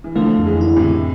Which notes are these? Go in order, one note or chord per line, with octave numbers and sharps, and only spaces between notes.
E3
D3 F3 A3
F2
E3 G#3
E4
A2 C3
D3